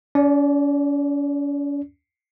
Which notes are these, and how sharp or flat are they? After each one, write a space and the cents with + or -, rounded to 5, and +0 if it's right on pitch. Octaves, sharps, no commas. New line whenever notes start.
C#4 +40 D5 -10